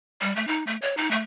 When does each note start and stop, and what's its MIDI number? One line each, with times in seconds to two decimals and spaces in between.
0.21 0.35 55
0.36 0.47 57
0.47 0.64 63
0.67 0.76 57
0.82 0.95 73
0.97 1.10 63
1.11 1.22 57